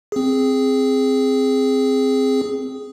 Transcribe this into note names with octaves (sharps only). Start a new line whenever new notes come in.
C4 G#4